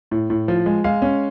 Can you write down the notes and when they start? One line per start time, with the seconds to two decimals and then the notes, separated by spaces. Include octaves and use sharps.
0.11 A2
0.30 A2
0.48 F3
0.66 G#3
0.84 G#3 F5
1.02 C#4